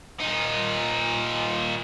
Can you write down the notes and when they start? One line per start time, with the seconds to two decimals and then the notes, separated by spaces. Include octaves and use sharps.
0.20 A#2 D#4